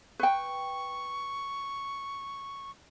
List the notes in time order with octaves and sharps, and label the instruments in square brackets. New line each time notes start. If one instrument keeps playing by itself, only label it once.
[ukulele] B4 G5 [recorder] C#6